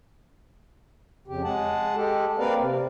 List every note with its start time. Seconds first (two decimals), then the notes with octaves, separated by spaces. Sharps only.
1.28 F2 C#3 G4
1.44 G#3 G#4 F#5 A5
1.95 G#3 G4 A4
2.39 A#3 C4 A#4 B4 D5 F5
2.59 C3